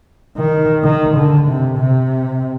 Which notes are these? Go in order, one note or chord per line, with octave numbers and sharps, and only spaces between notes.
D#3
D#3
D3
C3
C3